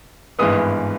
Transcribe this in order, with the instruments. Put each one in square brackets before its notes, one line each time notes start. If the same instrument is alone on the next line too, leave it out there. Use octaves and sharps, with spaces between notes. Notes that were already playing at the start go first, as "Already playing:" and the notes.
[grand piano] G#1 G2 E3 G#3 B3 D#6